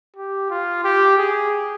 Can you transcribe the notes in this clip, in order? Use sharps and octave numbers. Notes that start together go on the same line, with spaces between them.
G4
F4
G4
G#4